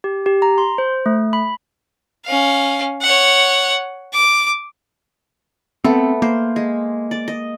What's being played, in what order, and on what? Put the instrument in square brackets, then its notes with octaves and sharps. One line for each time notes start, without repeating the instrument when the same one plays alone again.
[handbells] G4
G4
A#5
C6
C5
A3
B5
[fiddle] C#4 F5
C#5 F#5
D6
[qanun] A3 B3 [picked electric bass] C4
[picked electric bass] A#3 [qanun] C5
[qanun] G#3
D5
D#5